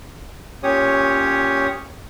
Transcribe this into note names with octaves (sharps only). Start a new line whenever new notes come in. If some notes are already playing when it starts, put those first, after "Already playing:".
A#2 C#4 G4 C#5 D#6